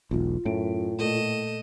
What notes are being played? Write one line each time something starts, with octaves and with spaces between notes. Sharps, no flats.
E1 B1 F4
F#2 A2 D7
A#2 A3 D#5 E7